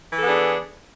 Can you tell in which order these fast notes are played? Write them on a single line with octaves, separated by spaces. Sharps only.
E3 A4 B3 G#4 D4